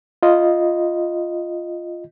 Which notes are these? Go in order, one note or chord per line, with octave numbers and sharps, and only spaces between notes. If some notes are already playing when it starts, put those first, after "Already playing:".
F4 D#5